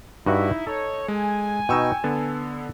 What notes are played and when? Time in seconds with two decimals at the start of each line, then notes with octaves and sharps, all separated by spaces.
0.26 G2 D#4 E4 F#4 E5
0.67 A4 C#5
1.08 G#3 G#5
1.69 B2 D#4 G5 C#6 E6
2.04 D3 B3 A5